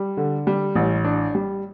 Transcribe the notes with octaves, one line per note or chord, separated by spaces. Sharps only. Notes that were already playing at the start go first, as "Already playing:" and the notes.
Already playing: G3
D3
G3
A1
D4
G3